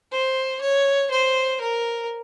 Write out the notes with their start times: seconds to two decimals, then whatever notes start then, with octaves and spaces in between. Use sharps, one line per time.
0.12 C5
0.61 C#5
1.11 C5
1.61 A#4